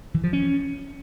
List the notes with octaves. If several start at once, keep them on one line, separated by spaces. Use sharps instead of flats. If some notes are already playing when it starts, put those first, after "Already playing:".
E3
F3
C#4